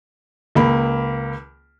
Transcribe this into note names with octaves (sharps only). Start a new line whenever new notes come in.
C#2 A#3 B5